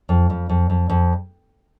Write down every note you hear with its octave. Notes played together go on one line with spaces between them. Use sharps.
F2
F2
F2
F2
F2